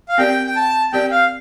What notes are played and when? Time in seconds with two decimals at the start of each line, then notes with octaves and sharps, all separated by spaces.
0.09 F5
0.18 C4 G4 A#4 D5 G5
0.47 G5
0.56 A5
0.93 C4 G4 A#4 D5 G5
1.11 F5